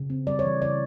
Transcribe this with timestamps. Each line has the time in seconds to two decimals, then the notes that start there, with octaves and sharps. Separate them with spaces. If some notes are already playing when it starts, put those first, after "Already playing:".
Already playing: C#3
0.10 C4
0.27 G3 D5
0.39 C#5
0.44 E3
0.61 C#3 D5